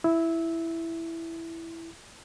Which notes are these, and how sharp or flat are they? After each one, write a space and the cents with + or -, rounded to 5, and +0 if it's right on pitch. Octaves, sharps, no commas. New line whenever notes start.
E4 +5 E6 -15